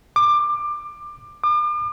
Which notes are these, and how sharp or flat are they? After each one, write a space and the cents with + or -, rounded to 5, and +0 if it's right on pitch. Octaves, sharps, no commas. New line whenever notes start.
D6 +20
D6 +40